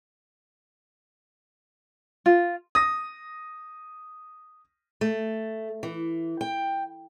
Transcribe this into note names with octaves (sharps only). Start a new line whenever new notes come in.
F4
D#6 A#6
A3
E3
G5